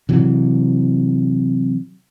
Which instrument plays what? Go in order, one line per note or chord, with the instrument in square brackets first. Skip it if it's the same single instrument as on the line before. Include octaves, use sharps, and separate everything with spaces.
[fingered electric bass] C3 E3 F#3